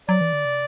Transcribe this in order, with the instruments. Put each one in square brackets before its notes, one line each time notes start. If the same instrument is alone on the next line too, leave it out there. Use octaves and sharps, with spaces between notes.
[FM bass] F#3 [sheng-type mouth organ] D5
[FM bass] E3
D3
C3